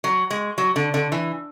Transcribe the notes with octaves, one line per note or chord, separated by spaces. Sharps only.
F#3
G#3
F#3
D3
D3
E3